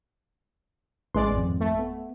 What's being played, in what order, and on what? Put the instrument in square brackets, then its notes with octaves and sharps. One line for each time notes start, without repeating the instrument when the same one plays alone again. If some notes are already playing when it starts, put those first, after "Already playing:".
[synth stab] A1 G#3 D5 [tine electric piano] B4 C6
[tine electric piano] G#1 F2
[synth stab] A3
[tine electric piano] B3